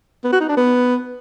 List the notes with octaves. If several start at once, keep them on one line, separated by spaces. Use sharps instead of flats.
B3
F#4
D#4
D4
B3